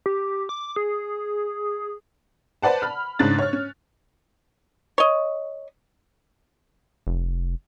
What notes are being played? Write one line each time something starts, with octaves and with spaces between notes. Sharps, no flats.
G4
D6
G#4
B4 C5 D5 F#5 A5
B5 F6
G#2 C#3 D4 F#6 A6
C#5 F6
C#4
C#5 D#5
F1